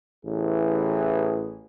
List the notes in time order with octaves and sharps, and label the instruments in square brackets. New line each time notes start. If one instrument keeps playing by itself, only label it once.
[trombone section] A1 E3 G#4